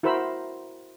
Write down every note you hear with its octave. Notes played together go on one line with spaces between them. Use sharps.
E4 F#4 A#4 C5 B5 E6